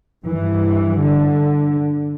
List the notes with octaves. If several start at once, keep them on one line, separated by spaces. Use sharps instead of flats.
G2 E3
D3